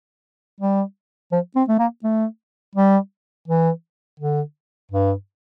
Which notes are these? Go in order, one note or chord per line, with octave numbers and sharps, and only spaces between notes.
G3
F3
C4
A3
A#3
A3
G3
E3
D3
G2